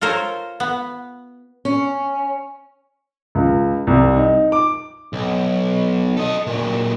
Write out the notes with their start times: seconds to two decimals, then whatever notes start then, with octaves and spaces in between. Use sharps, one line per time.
0.01 F4 A4 A#4 C5 C#5
0.60 B3
1.65 C#4
3.35 C#2
3.87 C2
4.16 D#4
4.52 D6
5.13 B1
6.17 A4 D#5
6.47 A#2 F#3